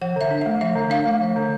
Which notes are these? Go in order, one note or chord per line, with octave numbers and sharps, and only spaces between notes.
F3 F#5
D3 E5
D4
E5
A3
F3 E5
D3
D4 F5
A3
F3
D3